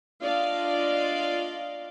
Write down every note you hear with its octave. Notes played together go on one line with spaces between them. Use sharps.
D4 F4 D5 D#5 F5